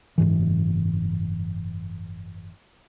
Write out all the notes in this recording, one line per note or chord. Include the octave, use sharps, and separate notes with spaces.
F#1 G#2 E3